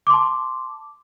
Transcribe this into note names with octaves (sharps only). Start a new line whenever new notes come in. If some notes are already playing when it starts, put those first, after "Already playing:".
A5 C6 D6